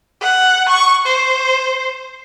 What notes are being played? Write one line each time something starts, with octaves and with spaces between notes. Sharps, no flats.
F#5
C#6
C5